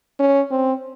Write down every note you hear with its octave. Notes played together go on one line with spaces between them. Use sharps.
C#4
C4